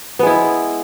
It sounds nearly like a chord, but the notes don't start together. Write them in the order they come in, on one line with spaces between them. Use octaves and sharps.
B3 G#3 E4